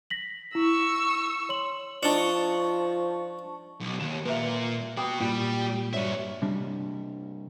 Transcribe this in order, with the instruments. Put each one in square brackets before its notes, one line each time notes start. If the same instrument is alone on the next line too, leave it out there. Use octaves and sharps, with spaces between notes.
[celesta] A#6 B6 F#7
[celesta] E4 [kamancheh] C#6 E6
[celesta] C#5 C6 F#7
[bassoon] F3 [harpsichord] D4 D#4 [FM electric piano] A5 C#6
[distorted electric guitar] B1
[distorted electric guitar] D#2 [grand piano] E7
[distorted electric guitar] A#2 A#4 [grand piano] B4 E5
[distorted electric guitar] F#4 B5 [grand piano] G5 D6 D#6
[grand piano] A#2 [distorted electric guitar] G3
[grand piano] G2 C#5 [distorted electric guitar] F#4 E5
[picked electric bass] C3 G3 D4